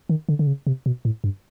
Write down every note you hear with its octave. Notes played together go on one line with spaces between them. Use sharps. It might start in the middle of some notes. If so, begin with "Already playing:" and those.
D#3
D3
D3
C#3
C3
B2
A2
G2